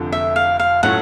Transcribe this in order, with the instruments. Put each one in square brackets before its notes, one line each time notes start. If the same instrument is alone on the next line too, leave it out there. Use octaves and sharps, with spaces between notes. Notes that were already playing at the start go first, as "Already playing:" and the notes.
Already playing: [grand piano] F1 F2 D3 F3
[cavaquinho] E5
F5
F5
[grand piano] A2 F#3 A3 C#4 F4 [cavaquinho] F#5